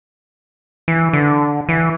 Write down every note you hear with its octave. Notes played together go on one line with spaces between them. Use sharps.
E3
D3
E3